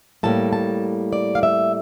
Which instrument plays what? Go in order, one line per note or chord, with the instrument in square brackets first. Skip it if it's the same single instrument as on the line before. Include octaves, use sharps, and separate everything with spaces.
[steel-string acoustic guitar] A2 G3 A#3 A5
A5
D5
F5
E5